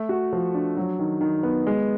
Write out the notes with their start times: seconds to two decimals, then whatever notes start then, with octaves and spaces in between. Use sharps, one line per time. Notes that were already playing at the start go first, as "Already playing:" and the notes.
Already playing: A3
0.09 F#4
0.33 F3
0.54 D4
0.77 F#3
0.99 D#3
1.21 D#3
1.43 B3
1.67 G#3